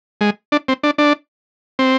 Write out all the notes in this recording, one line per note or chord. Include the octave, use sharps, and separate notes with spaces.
G#3
D4
C4
D4
D4
C4